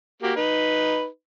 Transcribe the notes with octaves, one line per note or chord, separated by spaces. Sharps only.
A#3 F#4 G4
D#4 B4